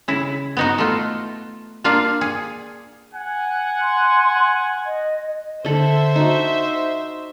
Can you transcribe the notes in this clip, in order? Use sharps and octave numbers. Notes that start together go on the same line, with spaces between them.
C#3 E4
B3 D#4 F#4
A3 F4
A#3 D4 F4 F5
G#4
F#5 G#5
C6
D#5
D3 A4 C5 E5
D#4 F#4